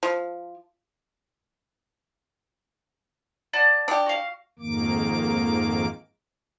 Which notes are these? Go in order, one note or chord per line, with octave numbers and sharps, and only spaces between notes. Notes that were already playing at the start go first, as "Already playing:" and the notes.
F3
D5 F#5 A5
D4 G4
F#4 F5
F2 G#2 D#3 A#3 D6